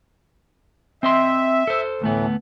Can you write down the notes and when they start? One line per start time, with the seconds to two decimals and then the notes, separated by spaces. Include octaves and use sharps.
1.03 C4 D#5 E5 C6
1.67 A4 C5
2.02 D2 A2 E3 A3 B3